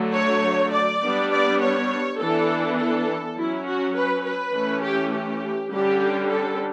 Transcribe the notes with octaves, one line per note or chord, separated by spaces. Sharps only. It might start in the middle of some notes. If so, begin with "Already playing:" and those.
Already playing: D3 F#3 A3
C#5
D5
G3 B3 D4
D5
C#5
E3 B3 D4 A4
A4
F#3 C#4 E4
F#4
B4
B4
E3 A3 C#4
G4
G4
D3 G3 C#4 G4
A4